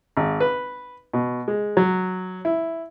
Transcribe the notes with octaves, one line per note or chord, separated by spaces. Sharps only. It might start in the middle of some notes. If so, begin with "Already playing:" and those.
G#1
B4
B2
G#3
F#3
E4